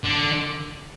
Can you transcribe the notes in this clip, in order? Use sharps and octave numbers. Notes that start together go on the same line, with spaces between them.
D3